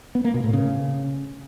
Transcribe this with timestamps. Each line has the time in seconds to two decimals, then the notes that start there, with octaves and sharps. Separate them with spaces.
0.15 B3
0.25 A#3
0.34 B2
0.44 A2
0.53 C#3